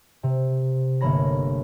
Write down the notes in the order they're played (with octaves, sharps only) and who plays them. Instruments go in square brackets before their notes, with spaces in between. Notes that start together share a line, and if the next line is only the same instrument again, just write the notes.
[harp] C3
G1 A3 A#3 C#5 B5 A#6